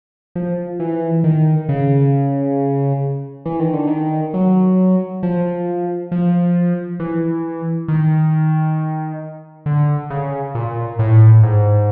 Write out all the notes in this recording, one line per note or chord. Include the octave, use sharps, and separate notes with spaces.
F3
E3
D#3
C#3
E3
D#3
D3
D#3
F#3
F3
F3
E3
D#3
D3
C#3
A#2
A2
G#2